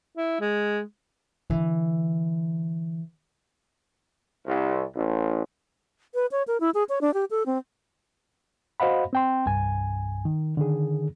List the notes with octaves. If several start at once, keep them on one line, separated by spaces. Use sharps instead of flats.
E4
G#3
D3 E3
C2
A1
B4
C#5
A#4
E4
G#4
C#5
D4
G4
A4
C4
F#4 C5 D#5 F5 F#5 B5
C4 G5 C6
C2 G2 G#5
D#3
D3 D#3 G#4